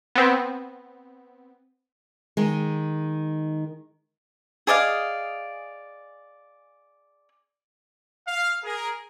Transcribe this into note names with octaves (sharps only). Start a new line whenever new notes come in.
B3 C4
D#3 G#3
G#4 D5 D#5 F5
F5
G#4 A#4